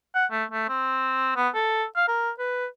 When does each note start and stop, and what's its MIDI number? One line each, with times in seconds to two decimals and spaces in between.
0.14 0.25 78
0.31 0.44 57
0.52 0.66 57
0.68 1.32 60
1.36 1.49 59
1.55 1.85 69
1.96 2.06 77
2.08 2.31 70
2.39 2.66 71